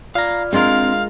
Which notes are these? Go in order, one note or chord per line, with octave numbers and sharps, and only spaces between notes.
F4 D5 F5 A#5 F6
G#3 C4 D4 F4 A#4 F5